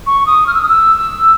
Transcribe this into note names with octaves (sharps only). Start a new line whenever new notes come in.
C#6
D#6
F6
E6
D#6
E6